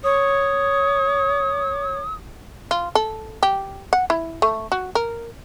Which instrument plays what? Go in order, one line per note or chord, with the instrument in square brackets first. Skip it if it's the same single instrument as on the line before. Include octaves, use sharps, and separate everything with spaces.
[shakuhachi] C#5 [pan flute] D#6
[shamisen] F4
A4
G4
F#5
E4
A3
F#4
A#4